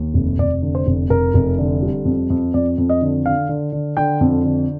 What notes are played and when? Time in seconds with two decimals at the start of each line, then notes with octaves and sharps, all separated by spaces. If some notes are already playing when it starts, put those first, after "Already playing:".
Already playing: D#2
0.14 F1
0.38 F1 D5
0.62 D3
0.75 C5
0.87 F1
1.10 F1 A#4
1.34 F1
1.58 D3
1.82 G3
2.05 F2
2.30 F2
2.54 F2 D5
2.78 F2
2.89 D#5
3.01 D3
3.25 D3 F5
3.49 D3
3.72 D3
3.97 D3 G5
4.21 F2
4.44 D3